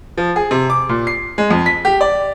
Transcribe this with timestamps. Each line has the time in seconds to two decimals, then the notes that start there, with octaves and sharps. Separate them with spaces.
0.17 F3
0.36 G#4
0.51 C3
0.70 D6
0.89 A#2
1.07 C7
1.38 G#3
1.51 F2
1.66 B6
1.85 G4
2.01 D5